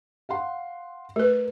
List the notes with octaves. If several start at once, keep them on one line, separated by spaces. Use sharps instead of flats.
F5 F#5 C6
A3 A#4 B4